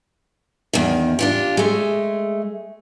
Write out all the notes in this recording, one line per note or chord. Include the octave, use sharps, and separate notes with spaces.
E2 D#3
D4 F4 G4
G#3 A3